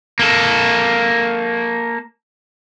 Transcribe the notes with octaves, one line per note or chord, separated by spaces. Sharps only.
A#3 A4